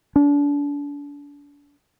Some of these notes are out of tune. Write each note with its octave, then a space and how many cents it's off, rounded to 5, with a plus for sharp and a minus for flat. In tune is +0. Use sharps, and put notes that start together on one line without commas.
D4 -35